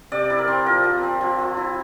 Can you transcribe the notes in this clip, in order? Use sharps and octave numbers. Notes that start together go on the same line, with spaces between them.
C3 D5
E4
A#4
C4
F3 A#4
F3
C4
F3
F3
E4